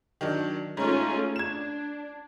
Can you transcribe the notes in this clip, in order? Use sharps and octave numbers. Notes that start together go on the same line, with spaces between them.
D#3 F#3 D4
G#2 A3 C#4 F4
D4 G#6 E7